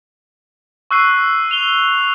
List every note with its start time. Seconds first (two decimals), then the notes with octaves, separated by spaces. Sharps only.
0.91 C#6 E6 F#6 C7 D#7
1.51 F7 G7